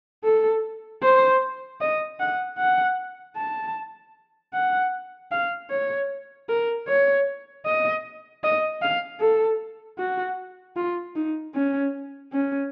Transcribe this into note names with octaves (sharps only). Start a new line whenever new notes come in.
A4
C5
D#5
F#5
F#5
A5
F#5
F5
C#5
A#4
C#5
D#5
D#5
F5
A4
F#4
F4
D#4
C#4
C#4